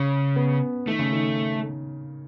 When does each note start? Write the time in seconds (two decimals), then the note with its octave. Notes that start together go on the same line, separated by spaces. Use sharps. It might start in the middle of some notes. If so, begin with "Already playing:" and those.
Already playing: C#3 C#4
0.36 B3
0.87 D#3 A3
0.99 C#3
1.12 D#3